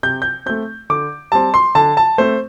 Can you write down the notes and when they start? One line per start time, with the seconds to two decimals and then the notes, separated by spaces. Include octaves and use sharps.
0.03 C3 G6
0.22 G6
0.46 A3 C4 G6
0.90 D3 D6
1.32 G3 C4 A5
1.54 C6
1.75 D3 A5
1.97 A5
2.18 A3 C4 C5